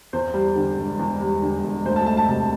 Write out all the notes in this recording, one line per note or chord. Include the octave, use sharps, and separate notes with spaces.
E2 C5
G3
D3
E1
E2
G3
D3
E1
D2 C5
A5
A3 A5
A5
C3 A5